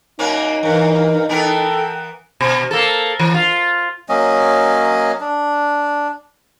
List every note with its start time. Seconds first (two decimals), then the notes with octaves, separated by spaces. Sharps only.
0.19 F#2 A#3 C#4 D#4
0.63 G2 E3 A#4
1.29 E3 B3 A4 A#4 G5
2.41 B2
2.71 A#3 A4
3.19 E3
3.34 F4
4.09 F#3 A#3 C#4 D#5
5.20 D4